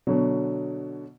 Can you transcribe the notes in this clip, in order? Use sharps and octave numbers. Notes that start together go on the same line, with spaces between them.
B2 D3 F#3